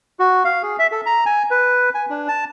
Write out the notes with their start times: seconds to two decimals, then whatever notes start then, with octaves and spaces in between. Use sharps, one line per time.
0.19 F#4
0.45 F5
0.62 G#4
0.79 E5
0.92 A4
1.06 A#5
1.26 G#5
1.51 B4
1.94 G#5
2.10 D4
2.28 A5